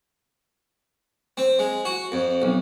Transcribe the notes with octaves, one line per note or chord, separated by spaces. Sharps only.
C4
G#3
F#4
F2
B1